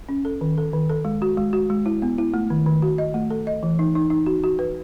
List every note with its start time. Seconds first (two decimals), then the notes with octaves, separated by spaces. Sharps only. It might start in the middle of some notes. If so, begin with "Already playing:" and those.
0.09 C#4
0.25 A4
0.41 D#3
0.58 A4
0.73 D#3
0.90 A4
1.05 G#3
1.22 F#4
1.37 G#3
1.53 F#4
1.70 G#3
1.86 E4
2.02 B3
2.18 E4
2.34 A3
2.50 D#3
2.66 D#3
2.82 F#4
2.98 D#5
3.14 A3
3.30 A4
3.47 D#5
3.63 E3
3.79 D#4
3.95 D#4
4.10 D#4
4.26 F#4
4.44 F#4
4.59 B4